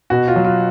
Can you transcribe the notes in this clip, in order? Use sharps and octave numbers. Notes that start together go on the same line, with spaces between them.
B2 F#4
F4
F#3
F4